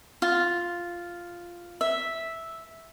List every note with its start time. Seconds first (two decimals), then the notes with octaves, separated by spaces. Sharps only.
0.22 F4
1.81 E5